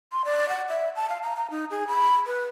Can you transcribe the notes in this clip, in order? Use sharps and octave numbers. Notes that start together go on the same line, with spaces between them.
C6
D5
F#5
E5
A5
F5
A#5
A#5
D#4
G#4
B5
B4